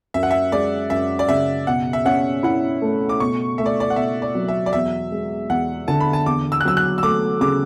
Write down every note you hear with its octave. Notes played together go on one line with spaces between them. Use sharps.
F#2 E5
F#5
E5
G#3 D5
F#2 E5
D5
C#3 E5
B2 F#5
E5
C#4 F#5
E4 F#5
A3
D6
B2 C#6
A3 E5
D5
D5
F#5
B2 E5
D5
F#3
E5
D5
E2 E5
G#3
E2 F#5
D3 A5
B5
A5
E2 D6
E6
F#6
F#3 E6
F#6
E6
A3 D6
C#3 D6